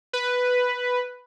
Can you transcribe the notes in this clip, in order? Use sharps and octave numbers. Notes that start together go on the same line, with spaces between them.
B4